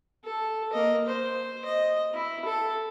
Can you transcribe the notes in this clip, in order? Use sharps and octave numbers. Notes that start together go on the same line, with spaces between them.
A4
A#3 D#5
C5
D#5
E4
A4